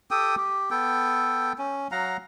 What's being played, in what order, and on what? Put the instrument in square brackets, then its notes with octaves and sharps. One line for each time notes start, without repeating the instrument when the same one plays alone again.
[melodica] G4 A4 G5 D#6
G4
B3 A4 G5
C#4
F#3 F5 F#5 A#5